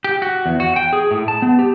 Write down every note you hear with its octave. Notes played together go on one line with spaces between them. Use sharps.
G4
F#4
E2
F#4
G5
G#4
A2
A5
B3
G4